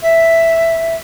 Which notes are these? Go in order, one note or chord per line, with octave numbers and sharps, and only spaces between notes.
E5